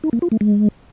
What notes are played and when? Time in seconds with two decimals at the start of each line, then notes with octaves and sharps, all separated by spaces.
0.04 D#4
0.13 A#3
0.22 F4
0.32 A3
0.41 G#3